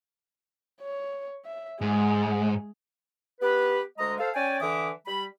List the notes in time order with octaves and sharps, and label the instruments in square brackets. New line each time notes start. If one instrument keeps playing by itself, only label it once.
[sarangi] C#5
E5
[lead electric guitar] G#2 [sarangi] G#3
[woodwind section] B3 G4 B4
D2 G#3 D#5 A#5 D#6
A4 C5 F5
C#4 D5 G5 G#5
D3 E3 E5 D6 D#6
G3 B5